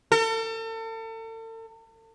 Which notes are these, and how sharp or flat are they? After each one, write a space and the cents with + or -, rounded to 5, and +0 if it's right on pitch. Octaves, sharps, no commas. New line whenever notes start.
A4 +40